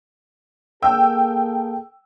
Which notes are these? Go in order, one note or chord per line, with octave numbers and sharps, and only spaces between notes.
A#3 G#4 A4 G5 E6